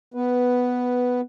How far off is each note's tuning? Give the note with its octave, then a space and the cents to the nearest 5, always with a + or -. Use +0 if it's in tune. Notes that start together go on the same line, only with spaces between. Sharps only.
B3 +5 B4 +0